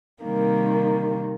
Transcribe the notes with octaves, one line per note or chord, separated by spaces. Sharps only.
C3 D#3 G3 A#3